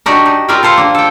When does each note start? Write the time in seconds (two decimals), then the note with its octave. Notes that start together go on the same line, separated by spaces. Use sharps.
0.06 D4 D#4 F#4 G4 D5
0.26 D#4
0.49 F4 A#4 D5 E5 F5 G5
0.63 F4 A4 C5 F5
0.77 A#3 D4
0.95 A4 G5